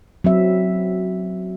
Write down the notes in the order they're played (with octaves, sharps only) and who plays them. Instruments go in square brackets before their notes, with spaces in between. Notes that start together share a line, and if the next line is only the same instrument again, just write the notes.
[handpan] F#3 C4 E5